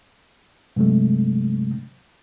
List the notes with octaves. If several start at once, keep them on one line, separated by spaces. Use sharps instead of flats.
G2 C3 F#3 G#3 A3